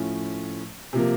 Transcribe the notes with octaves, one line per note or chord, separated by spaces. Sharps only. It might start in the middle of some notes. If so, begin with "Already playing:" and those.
Already playing: A2 F3 A3 C#4
C3 F3 A#3